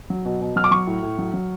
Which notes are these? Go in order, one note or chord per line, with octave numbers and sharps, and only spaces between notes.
F#3
B2
B2
F#3 F6
D6
F#3 C#6
A2
A2
F#3
F#3